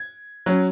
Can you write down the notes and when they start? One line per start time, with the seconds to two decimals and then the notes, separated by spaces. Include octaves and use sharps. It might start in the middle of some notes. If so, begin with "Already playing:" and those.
Already playing: G#6
0.46 F#3 C#4